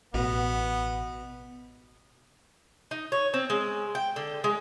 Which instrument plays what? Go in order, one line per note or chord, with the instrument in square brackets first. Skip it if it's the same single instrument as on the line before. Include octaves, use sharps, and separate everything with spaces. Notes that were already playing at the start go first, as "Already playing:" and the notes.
[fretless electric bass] A1 [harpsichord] B2 [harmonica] B3
[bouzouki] D#4
C#5
C4
G#3
G5
D3
G#3